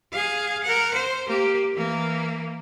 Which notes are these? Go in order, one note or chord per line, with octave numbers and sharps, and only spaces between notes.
G#4 F5
A#4 F#5
C5
A#3 G4
E3 A#3